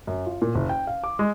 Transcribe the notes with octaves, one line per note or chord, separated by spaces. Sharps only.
F#2
F4
A#2
F#1
G5
F5
D6
G#3